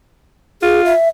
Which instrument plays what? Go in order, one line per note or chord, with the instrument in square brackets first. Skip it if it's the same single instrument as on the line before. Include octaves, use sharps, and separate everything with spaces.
[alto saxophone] F4 [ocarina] G#4
[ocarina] E5